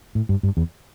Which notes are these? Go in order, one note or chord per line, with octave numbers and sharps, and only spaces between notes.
A2
G2
G2
E2